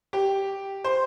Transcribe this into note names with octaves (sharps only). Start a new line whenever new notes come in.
G4
C5